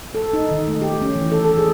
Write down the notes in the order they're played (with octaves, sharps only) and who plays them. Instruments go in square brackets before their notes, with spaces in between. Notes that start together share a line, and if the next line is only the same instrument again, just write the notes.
[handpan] A4
D#4
D#3
A3
G4
C#4
E3
A4
A4
G#4